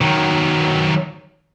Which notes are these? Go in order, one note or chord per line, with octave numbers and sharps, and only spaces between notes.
D#3 F#3